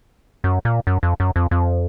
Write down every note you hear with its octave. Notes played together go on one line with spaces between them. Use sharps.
F#2
A#2
F#2
F2
F#2
F2
F2